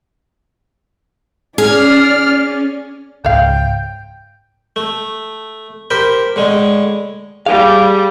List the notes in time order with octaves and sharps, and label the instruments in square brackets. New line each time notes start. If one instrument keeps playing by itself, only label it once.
[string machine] C#4 [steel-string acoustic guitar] G#4 [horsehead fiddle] D5 [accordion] F6
[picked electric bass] C#2 G#2 [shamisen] C5 C#5 F5 [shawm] G5
[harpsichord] A3
G4 A#4 C5 B5
A2 D3 G#3
[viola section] G3 [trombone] G#4 [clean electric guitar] F5